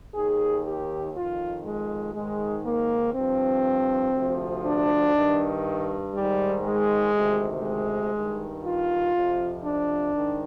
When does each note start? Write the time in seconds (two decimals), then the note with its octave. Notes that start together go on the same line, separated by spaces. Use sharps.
0.14 D#2 D#3 G#4
0.64 G4
1.13 F2 D#3 F4
1.64 G#3
2.14 G#2 D#3 G#3
2.64 A#3
3.13 G2 F3 C4
4.13 D2 C3 F3
4.63 D4
5.14 G2 D#3
6.13 G#2 D#3 G3
6.63 G#3
7.13 D2 C3 D#3
7.63 G#3
8.13 G2 D#3
8.64 F4
9.13 F2 C3 F3
9.63 D4
10.13 G#2 D#3